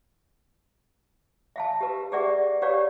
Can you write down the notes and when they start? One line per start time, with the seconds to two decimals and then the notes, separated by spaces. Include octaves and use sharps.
1.56 E5 F5 A5
1.81 G4 B4
2.12 G4 G#4 B4 D5 E5 F#5
2.62 G4 B4 C#5 D5 F5 F#5